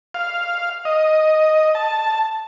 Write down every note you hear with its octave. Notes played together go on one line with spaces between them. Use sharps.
F5
D#5
A5